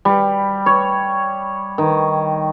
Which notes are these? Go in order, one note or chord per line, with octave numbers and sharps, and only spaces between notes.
G3
C#5
D#3